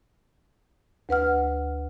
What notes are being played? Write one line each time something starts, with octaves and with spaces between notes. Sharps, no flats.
D2 B4 F#5 F6